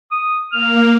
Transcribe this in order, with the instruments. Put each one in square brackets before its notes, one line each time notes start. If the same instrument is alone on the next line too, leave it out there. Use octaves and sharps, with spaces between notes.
[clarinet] D#6
[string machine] A#3 [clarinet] F6